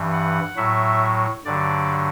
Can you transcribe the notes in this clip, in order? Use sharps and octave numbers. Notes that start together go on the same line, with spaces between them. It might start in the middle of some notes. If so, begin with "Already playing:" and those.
Already playing: G2 E3
F#5
A2 F#3 E5
G2 D3 F#3 D5